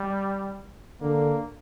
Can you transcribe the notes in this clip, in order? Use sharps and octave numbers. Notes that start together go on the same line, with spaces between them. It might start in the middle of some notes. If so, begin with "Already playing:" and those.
Already playing: G3
D3 A#3